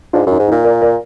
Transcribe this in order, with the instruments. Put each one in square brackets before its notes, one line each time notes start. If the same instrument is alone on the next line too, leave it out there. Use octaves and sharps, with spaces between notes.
[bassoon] G#2 [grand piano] D4 F4
[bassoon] F#2
[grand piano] D#4
[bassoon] G#2
[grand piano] D#4
[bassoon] A#2
[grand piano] A#4 D5
A#4 D5